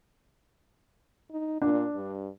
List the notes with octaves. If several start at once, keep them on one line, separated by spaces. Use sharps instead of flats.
D#4
A#2 D4
G2